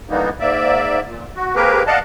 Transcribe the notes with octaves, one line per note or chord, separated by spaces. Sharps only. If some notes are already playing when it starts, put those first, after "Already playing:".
D3 E3 G3 A#3 B3 D#4
G#2 A#3 D5 E5
A#2
F#4
A#3 C4 G4 G#4 A#4 B4
D5 D#5 F5 F#5 A5